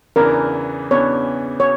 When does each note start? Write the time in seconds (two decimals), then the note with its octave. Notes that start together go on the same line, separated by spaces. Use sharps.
0.16 E2 C#3 E3 B3 D4 A#4
0.91 E2 C#3 E3 B3 D4 C#5
1.60 C#5